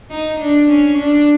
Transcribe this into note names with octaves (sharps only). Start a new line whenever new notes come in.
D#4
D4
C#4
D4